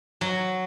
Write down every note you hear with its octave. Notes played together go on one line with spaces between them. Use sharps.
F#3